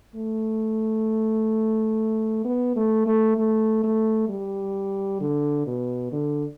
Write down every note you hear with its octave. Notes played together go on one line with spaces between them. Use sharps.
A3
B3
A3
A3
A3
A3
G3
D3
B2
D3